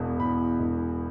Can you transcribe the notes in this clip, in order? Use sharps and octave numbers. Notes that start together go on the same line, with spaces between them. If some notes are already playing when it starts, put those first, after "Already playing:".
Already playing: E1 E2
E1 B5
E1